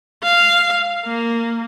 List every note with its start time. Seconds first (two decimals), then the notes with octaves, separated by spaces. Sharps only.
0.23 F5
1.05 A#3